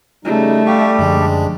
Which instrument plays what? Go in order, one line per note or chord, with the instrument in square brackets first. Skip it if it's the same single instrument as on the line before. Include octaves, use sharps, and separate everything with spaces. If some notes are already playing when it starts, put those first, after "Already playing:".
[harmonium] C#3 G3 D#4 [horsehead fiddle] A3
[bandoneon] G3 G4 [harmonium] D5 [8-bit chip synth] E5 F5 C#6
[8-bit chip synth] F#2 D3 F3 [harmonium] G#3 D4